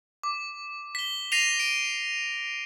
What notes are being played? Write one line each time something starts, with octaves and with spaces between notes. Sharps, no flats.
D6
B6 G7
A#6 C7 D#7 F7
D7